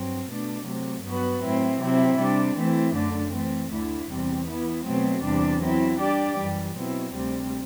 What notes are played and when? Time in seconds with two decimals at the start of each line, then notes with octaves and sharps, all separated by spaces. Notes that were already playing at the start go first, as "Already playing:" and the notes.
Already playing: G2 F#3 C4
0.29 B2 A3 D4
0.66 C3 F#3 A3
1.05 G2 F#3 B3 F#4 B4
1.43 A2 F#3 C4 E4
1.81 C3 F#3 C4 E4
2.19 C3 G3 D4
2.56 E3 A3 C4 E4
2.95 F#2 D3 A3 D4
3.33 E3 A3 C4
3.71 D2 D3 A3 E4
4.09 E2 C3 G3 C4
4.47 E3 B3 E4
4.85 B2 F#3 A3 C4
5.24 E2 C3 G3 D4
5.61 F#3 C4 E4
5.99 G3 D4 G4 D5
6.37 F#2 E3 G3
6.76 B2 F#3 C4 E4
7.13 D2 C3 G3 C4